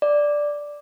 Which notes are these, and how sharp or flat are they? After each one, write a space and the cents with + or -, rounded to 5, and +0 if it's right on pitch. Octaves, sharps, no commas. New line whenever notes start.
D5 +0